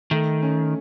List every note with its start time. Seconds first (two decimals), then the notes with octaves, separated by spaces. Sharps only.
0.11 D#3 A3
0.42 C#4